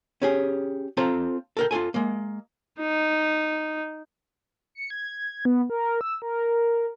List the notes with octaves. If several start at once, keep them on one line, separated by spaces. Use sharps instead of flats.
C#4 G4 G#4
C4 F4 A4 C5 A#5
A4 A#4 G5
F4 F#4 A4 G#5
G#3 A#3
D#4
C#7
G#6
B3
A#4
E6
A#4